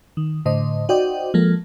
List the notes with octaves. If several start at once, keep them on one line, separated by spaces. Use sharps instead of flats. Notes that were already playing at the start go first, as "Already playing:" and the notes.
D#3
A2 D3 C5 D#5
D#4 F#4 C5 D5 D#5 G5
F3 G#3 A#3 A4